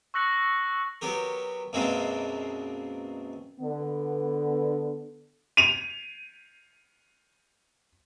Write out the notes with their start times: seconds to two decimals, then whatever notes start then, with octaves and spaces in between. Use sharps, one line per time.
0.14 C#6 E6 F#6 A#6 C#7 F#7
1.01 F#3 B3 G4 A#4
1.73 F#2 B2 G#3 A#3 C4 D4
3.60 D3 B3
5.57 D#7 F7